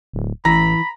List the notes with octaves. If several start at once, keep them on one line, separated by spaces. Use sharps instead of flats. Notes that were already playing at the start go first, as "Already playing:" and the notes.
D1
A1 E3 A#5 B5 A#6